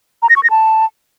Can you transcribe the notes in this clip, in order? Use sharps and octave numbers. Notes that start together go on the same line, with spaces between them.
A#5
A#6
C#6
A#6
A5